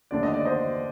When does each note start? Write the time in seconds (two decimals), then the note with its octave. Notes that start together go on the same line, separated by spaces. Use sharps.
0.11 D#2 D3 A3 D4 D5
0.23 D#5
0.34 D5
0.46 C5 D#5